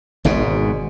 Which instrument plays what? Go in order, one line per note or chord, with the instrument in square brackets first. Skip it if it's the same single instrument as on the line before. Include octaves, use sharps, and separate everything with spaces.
[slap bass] G#1 G#2 B2